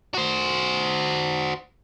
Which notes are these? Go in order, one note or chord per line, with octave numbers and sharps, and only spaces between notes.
F#4 C5